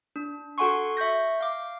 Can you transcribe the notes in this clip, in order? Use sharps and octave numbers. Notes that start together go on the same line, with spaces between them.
D4
F#4 A4 F#5 G#5 C6 C#6
E5 C#6 G6 A#6
F5 D6